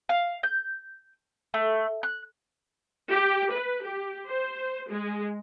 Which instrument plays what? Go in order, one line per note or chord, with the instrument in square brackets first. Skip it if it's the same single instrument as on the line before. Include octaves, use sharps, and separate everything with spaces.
[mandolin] F5
G6
A3
F#6
[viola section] G4
B4
G4
C5
G#3